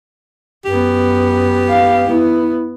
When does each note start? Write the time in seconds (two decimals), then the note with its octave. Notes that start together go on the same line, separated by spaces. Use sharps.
0.65 F#2 B3 G4
1.69 F5
2.07 B3 E4